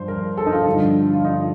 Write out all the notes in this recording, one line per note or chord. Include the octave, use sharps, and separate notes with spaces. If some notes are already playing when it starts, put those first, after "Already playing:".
Already playing: G2 F3 C5
A#4
A4
D#4
F4
G2 D3 F3
F4
D#4